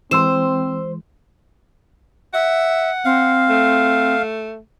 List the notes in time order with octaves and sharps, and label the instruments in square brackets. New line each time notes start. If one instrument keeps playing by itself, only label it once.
[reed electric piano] E3 G#3 [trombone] C4 [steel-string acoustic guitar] C5 [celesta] C6 E6 E7
[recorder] E5 [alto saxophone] F#5
[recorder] C4 [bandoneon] F5
[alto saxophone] A3